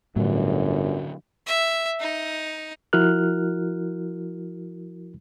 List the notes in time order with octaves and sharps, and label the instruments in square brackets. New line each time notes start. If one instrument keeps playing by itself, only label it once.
[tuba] G1 [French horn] F#2 [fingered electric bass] A2 [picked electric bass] D3 F#3
[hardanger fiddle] E5
D#4
[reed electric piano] F3 E4 F#4 A#4 F6 F#6